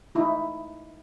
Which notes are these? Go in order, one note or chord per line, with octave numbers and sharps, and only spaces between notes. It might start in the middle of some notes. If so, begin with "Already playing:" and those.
D#4 E4